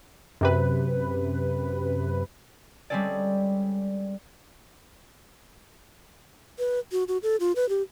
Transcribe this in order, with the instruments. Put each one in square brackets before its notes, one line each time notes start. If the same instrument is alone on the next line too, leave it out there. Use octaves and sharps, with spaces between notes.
[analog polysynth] F#2 C3 B4
[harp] G3 G#3 C4 C#4 A4 D5
[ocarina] B4
F#4
F#4
A4
F4
B4
G4